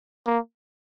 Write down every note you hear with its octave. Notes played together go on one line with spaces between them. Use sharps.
A#3